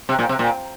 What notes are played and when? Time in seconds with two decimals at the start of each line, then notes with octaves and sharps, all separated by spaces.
0.09 C3
0.19 A#2
0.29 C3
0.39 A#2